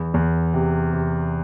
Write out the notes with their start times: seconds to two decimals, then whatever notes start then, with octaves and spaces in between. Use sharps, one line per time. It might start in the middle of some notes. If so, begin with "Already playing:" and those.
Already playing: E2
0.14 E2
0.54 C3
0.93 C3